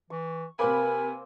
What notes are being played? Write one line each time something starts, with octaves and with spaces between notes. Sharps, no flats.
E3 C#6
C3 A#3 C4 A#4 B4 G#5 B5 E6